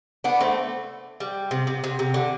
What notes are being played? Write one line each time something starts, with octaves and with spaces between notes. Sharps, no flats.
B3 D4
A3 C4
G3
C3
C3
C3
C3
D3